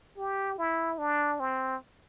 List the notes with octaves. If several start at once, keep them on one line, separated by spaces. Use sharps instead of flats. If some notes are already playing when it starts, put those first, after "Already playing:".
G4
E4
D4
C4